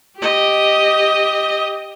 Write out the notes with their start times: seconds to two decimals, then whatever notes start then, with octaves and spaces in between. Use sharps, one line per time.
0.18 G4 D#5